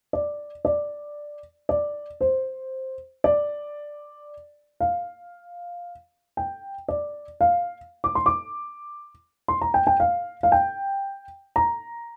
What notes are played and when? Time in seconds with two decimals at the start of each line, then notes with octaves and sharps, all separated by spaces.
0.13 D5
0.65 D5
1.69 D5
2.21 C5
3.24 D5
4.80 F5
6.37 G5
6.88 D5
7.41 F5
8.04 D6
8.15 C6
8.26 D6
9.48 C6
9.61 A#5
9.74 G5
9.87 G5
10.00 F5
10.43 F5
10.52 G5
11.56 A#5